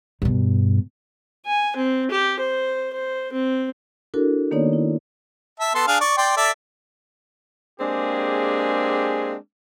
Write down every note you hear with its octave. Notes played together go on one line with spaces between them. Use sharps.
G2 B2
G#5
C4
G4
C5
C5
C4
D4 E4 F#4 A4 A#4
D#3 A#3 B3 D#4 C#5 D5
E4
E5 A5
B3 A4 C6
D4 G#4 F5
D5 C#6
D5 G5 C6
A4 D5 E5
G#3 A#3 C4 D4 G4 G#4